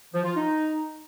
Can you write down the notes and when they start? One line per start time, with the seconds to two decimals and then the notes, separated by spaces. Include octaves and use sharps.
0.12 F3
0.24 F4
0.36 D#4